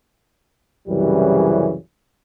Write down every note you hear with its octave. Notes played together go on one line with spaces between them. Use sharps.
C2 F#2 C#3 E3 G3